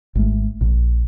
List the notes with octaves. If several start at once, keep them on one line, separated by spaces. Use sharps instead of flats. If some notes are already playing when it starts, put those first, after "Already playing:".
G#1 G#3 A3
A#1 A#2